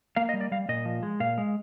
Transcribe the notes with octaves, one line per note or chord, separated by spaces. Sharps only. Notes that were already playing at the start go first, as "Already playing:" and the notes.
A#3 F5
D#5
G3
D5
G3 F5
A#2 D#5
F3
G#3
A#2 F5
G#3